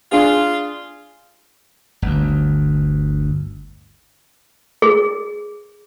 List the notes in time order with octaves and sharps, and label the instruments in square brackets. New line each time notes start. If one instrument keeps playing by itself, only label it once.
[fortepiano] D4 G#4 [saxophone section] F4
[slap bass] G1 D2
[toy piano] G#4